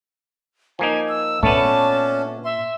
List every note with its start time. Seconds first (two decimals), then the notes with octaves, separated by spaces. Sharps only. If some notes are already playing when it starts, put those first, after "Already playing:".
0.79 F3 A#3 D#4 G#5
1.08 E6
1.43 A#2 A3 B3 C#4 D4 A5
2.44 E5 C6